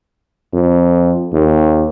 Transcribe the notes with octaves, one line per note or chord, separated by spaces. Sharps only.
F2
D#2